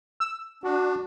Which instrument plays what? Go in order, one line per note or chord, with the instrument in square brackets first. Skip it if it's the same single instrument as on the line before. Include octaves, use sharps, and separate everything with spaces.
[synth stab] E6
[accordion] D4 [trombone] F#4